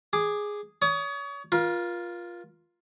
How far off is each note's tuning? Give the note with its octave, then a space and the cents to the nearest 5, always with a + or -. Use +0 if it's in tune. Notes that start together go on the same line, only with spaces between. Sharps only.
G#4 +0 D6 +10
C#5 +35 D#6 -5
F4 +0 A#4 +40